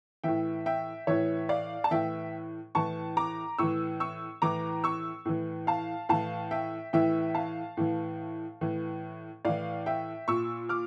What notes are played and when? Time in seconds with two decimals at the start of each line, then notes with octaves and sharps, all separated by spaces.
0.24 A2 E3 E5 G5
0.66 E5 G5
1.07 A2 E3 C#5 E5
1.49 D5 F5
1.84 A5
1.91 A2 E3 E5 G5
2.75 A2 E3 A5 C#6
3.17 A#5 D6
3.59 A2 E3 C#6 E6
4.00 C#6 E6
4.42 A2 E3 A#5 D6
4.84 C#6 E6
5.25 A2 E3
5.67 F5 A5
6.09 A2 E3 F5 A5
6.51 E5 G5
6.93 A2 E3 E5 G5
7.35 F5 A5
7.77 A2 E3
8.61 A2 E3
9.45 A2 E3 D5 F5
9.86 E5 G5
10.28 A#2 C#6 E6
10.69 D6 F6